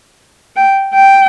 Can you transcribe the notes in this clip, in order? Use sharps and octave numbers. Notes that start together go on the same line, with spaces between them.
G5
G5